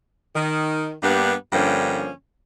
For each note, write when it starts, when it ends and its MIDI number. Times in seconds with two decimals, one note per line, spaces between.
0.34 0.91 51
1.02 1.33 43
1.02 1.33 58
1.02 1.33 59
1.02 1.33 62
1.02 1.33 67
1.53 2.10 43
1.53 2.10 50
1.53 2.10 53
1.53 2.10 58
1.53 2.10 61